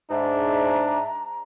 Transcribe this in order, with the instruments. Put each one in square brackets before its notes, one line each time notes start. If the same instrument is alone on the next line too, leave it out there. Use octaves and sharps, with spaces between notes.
[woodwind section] G#2 [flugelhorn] D4 [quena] E5 [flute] A#5